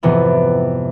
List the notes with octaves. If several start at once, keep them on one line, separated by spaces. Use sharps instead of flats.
F2 G#2 C3 E3 B3 C4